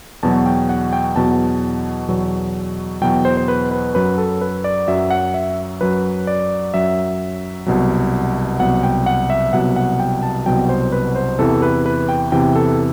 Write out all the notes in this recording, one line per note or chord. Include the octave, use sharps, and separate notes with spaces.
E2 B2 F#3 A5
G5
F#5
G5
E2 B2 F#3 A5
E2 B2 F#3
E2 B2 F#3 G5
C5
C5
B4
B4
F#2 F#3 B4
A4
B4
D5
F#2 F#3 E5
F#5
E5
F#2 F#3 B4
D5
F#2 F#3 E5
C2 B2 F#3
C2 B2 F#3 F#5
G5
F#5
E5
C2 B2 F#3 F#5
F#5
G5
A5
C2 B2 F#3 G5
C5
B4
C5
E2 C3 E3 A4
B4
B4
G5
E2 C3 E3 G5
A4